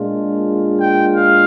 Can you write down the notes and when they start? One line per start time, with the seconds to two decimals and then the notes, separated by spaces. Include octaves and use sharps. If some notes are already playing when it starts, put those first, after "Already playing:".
Already playing: A#2 G#3 D4 F4
0.79 G5
1.14 F5